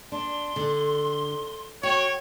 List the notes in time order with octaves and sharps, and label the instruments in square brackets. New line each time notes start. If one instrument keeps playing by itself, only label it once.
[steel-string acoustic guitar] D4 [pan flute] C6
[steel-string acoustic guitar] D3
[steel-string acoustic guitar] F#4 [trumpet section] C#5 [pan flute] G5